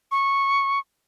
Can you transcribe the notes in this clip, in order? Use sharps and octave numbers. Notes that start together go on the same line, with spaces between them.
C#6